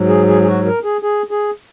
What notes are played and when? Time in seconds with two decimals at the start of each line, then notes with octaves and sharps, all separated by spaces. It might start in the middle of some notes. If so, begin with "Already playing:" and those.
Already playing: G#2 F#3
0.09 G#4
0.28 G#4
0.42 G#4
0.47 F#4
0.66 A#4
0.84 G#4
1.03 G#4
1.31 G#4